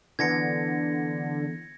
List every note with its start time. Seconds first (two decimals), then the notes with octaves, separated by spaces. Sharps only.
0.19 D3 E3 B3 G#6 A#6 C#7